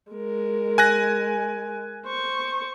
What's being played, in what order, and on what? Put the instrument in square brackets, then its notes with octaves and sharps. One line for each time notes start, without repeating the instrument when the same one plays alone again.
[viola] G#3 A#4
[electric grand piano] G#5 F#6 A#6
[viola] C5 C#6